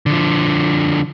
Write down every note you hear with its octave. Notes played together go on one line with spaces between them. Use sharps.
D3 F3